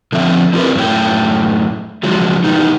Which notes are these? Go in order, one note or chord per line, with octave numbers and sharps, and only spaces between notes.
D3 F3 C4 E5
C4 E4 F4 G4 A#4 B4
F#2 A2 C#5 G5
C#3 F3 F#3 G#3
D#3 E3 G3 B3 D#4